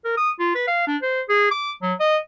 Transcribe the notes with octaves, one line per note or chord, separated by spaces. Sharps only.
A#4
D#6
F4
B4
F5
D4
C5
G#4
D6
F#3
D#5